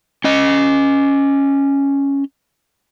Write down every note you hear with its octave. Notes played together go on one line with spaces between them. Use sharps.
C#4 D#5